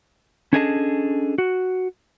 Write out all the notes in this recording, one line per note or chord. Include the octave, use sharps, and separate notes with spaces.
C#4 D4 G#4 A4 D#5 A5
F#4